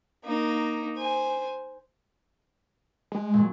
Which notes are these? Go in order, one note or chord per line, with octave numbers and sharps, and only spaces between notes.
A#3 D#4
C5 G#5
G#3
A#2 F#3